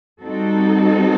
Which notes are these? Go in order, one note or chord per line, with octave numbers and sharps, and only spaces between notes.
G3 C4 D#4 F#4 A4